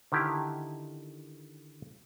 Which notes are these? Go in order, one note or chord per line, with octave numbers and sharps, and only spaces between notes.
D3 D#3 E4 G4